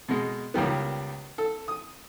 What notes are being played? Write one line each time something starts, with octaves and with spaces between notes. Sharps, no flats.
B2 G#3
C#2 D#3 G3 B3
A4
D#6